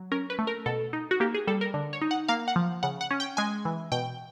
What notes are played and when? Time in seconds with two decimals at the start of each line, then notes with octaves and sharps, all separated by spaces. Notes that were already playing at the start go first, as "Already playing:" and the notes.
Already playing: F#3
0.12 C#4 A#4
0.30 B4
0.39 A3
0.47 A#4
0.66 B2 A4
0.93 D#4
1.11 F#4
1.20 A#3 G4
1.34 G#4
1.47 G3 A4
1.61 A#4
1.74 D3
1.93 C#5
2.02 D#4
2.11 F#5
2.28 A#3 F5
2.48 F#5
2.56 F3
2.83 C#3 F#5
3.01 F#5
3.11 C#4
3.20 G5
3.37 G#3 G#5
3.65 E3
3.92 B2 G5